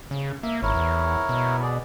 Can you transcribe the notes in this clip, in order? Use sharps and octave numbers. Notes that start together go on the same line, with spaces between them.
C#3
A#3 E5
G#1 E4 A#4 C#5
E2
B2
G#4 D5